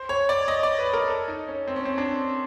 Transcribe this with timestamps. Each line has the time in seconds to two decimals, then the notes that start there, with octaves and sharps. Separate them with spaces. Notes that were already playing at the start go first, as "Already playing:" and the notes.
Already playing: C5
0.09 C#5
0.29 D5
0.48 D#5
0.63 D5
0.78 B4
0.93 A#4
1.08 A4
1.28 D#4
1.48 C#4
1.68 C4
1.76 C#4
1.85 C4
1.98 D4